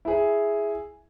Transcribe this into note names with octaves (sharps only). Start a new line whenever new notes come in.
E4 G#4